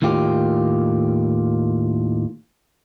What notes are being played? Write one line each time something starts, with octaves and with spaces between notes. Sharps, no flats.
D#2 A2 D#3 F4 G4